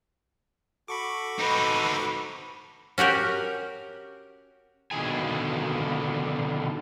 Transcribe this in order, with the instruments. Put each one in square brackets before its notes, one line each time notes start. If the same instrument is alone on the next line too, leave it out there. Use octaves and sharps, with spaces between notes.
[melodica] F#4 A4 [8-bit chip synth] B5 C#6 D6
[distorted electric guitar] C4 D#4 [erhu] B4
[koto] C#4 F#4 G4 A#4
[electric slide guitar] B2 D3 D#3 G#4 G#5